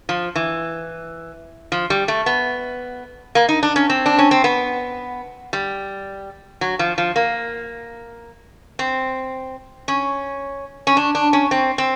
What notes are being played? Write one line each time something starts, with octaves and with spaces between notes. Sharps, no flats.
F3
E3
F3
G3
A3
B3
A#3
D#4
D4
C#4
C4
D4
C#4
C4
B3
G3
F#3
F3
F3
A#3
C4
C#4
C#4
D4
D4
C#4
C4
C4